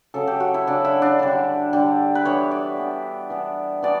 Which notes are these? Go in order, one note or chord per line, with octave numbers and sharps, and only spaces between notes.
C#3 F#3 C#4 A4
G4
F#4
E4
C#3 F#3 C#4 D4
E4
D4
D3 G3 D4
D3 G3 D4
B4
E3 B3 D4 C#5
D5
E3 B3 D4
E3 B3 D4
E3 B3 D4 D5